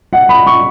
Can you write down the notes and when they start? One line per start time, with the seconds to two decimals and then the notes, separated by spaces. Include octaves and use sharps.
0.13 F#5
0.29 B5
0.47 C#6